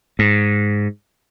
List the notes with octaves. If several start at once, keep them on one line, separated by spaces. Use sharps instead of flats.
G#2